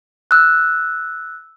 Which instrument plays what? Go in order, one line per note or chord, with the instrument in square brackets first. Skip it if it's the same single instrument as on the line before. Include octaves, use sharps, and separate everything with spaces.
[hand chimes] E6 F#6